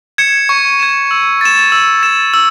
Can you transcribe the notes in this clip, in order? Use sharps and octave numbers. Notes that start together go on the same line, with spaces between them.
G#6 C#7 E7
C#6
G#6 C#7 E7
E6
A6 E7
E6
A6 E7
E6